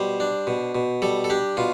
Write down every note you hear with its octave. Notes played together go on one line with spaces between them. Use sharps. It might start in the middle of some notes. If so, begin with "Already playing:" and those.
Already playing: B2 G3 C5
D4
B2
B2
G3 A4
A4
D4 G4
B2 F4